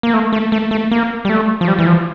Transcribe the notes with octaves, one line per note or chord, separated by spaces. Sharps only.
A#3
A3
A3
A3
A3
A#3
G3
A3
F3
G3
E3
F3